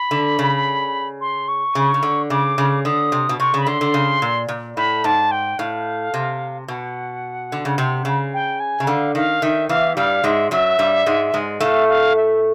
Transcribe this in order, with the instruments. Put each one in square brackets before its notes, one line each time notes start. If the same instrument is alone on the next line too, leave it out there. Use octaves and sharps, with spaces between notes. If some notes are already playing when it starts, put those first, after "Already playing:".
Already playing: [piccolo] B5
[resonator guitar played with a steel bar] D3
C#3
[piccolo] C6
C#6
[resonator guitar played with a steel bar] C#3
C#3
D3
[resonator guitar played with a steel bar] C#3 [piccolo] D6
[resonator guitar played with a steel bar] C#3
[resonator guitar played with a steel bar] D3 [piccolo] D#6
[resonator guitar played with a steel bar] C3
B2
[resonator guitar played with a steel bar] C3 [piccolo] C#6
[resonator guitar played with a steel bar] C#3
[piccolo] B5
[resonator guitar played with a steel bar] D3 [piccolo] C6
[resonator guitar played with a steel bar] D3
C#3
A#2
A#2
[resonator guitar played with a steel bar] A2 [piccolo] B5
[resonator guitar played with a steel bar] G#2 [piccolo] A5
[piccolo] G5
[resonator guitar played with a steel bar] A2 [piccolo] F5
[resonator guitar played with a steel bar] C3
[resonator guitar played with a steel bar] B2 [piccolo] F#5
[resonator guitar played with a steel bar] D3
C#3
C3
C#3
[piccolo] G5
G#5
[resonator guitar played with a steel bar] C#3
[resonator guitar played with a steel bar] D3 [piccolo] F5
[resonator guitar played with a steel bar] D#3 [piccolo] F5
[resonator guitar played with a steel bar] D#3 [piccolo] E5
[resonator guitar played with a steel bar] E2 E3 [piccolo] F5
[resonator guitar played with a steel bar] G2 G3 [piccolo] F5
[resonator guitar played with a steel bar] G#2 G#3 [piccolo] E5
[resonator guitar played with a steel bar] F#2 F#3 [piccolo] E5
[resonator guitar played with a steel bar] G2 G3
G#2 G#3
G#2 G#3
[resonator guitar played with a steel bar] A2 A3 [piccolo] F5
[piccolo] F5
E5